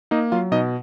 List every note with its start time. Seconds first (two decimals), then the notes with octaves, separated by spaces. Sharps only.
0.11 A#3 D#4 D#5
0.32 F#3 F4 F5
0.52 B2 D#4 D#5